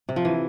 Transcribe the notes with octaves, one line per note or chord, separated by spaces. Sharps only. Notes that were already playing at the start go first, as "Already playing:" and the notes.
C3
F3
E3